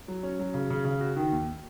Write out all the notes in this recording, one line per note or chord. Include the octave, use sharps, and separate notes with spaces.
F#3
C#4
F#3
C#3
C#3
C#3
F#4
D#3
D#2